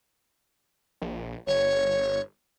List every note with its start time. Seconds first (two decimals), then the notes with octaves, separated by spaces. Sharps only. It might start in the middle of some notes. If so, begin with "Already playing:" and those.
1.02 A#1
1.47 G1 C#5